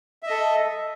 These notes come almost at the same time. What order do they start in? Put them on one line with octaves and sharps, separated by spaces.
E5 D#5 A4